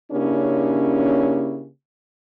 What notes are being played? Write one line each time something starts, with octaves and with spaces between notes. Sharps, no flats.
C#3 A#3 C#4 D4 E4 G4